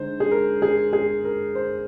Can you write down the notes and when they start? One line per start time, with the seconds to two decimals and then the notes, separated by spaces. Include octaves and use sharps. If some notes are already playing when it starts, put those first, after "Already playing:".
Already playing: D3 G#3 D#4 C5
0.20 G#4
0.31 A#4
0.62 G#4
0.93 G#4
1.25 A#4
1.55 C5